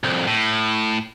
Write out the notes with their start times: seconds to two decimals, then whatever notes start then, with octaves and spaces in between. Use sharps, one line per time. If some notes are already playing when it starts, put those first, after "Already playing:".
0.04 C2 F2
0.27 A2